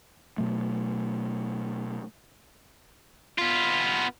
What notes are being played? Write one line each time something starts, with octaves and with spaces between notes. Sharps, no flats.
B2 F#3 A3
B3 F4